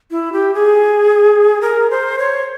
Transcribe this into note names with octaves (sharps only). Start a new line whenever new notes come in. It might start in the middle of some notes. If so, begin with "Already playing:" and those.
E4
G4
G#4
A#4
C5
C#5